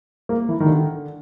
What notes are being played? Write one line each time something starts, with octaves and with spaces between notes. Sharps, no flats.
A#3
E3
D#3
D3